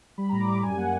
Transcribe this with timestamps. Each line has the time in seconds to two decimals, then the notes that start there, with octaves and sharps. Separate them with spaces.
0.18 G3 B5
0.29 A2 A#5
0.40 D6
0.47 G3
0.63 F#2 G#5
0.77 A#3 F#5